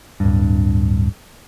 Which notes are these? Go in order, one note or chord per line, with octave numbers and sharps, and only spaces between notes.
D1 G2